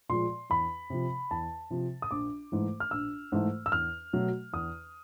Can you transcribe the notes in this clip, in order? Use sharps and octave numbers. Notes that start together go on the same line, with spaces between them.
A#2 F3 G#3 C6
E2 B5
C3 F3
E2 A5
C3 F3
D#6
A#1 D6
G#2 E3 A3
F6
A#1 E6
G#2 E3 A3
E6
E2 F6
B2 F#3 A3
E2 D#6